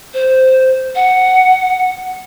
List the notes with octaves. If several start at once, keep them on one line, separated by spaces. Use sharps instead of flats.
C5
F#5